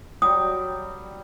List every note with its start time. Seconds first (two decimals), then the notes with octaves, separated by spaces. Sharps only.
0.22 F#3 G3 G5 D#6